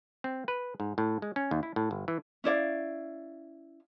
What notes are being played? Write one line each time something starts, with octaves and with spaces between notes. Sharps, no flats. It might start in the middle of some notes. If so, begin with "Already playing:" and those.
C4
B4
G#2
A2
G#3
C#4
D#2
E4
A2
G1
E3
C#4 E4 D5 F5